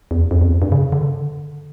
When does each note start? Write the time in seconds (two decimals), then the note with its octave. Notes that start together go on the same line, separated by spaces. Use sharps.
0.11 E2
0.31 F2
0.41 E2
0.51 F2
0.62 G2
0.72 C#3
0.92 D3